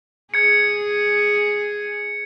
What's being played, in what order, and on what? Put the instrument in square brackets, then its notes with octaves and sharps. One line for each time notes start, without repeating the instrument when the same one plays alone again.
[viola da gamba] G#4 [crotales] G#6 C#7